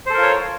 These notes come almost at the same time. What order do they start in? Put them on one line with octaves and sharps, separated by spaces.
C5 A4 A#4 F4 C#5